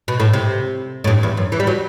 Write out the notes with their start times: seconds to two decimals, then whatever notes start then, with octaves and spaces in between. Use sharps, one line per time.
0.08 B2
0.20 A2
0.33 C3
1.04 A2
1.07 G2
1.23 E2
1.37 F#2
1.52 E3
1.60 G3
1.67 F#3